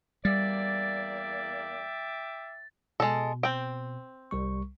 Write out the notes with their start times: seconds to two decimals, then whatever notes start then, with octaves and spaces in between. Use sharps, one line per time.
0.25 E2 G3 A#3 D5 E5 G5 D6 A6
3.00 B2 G#3 A4
3.43 C4 G5
4.31 C2 G3 C#6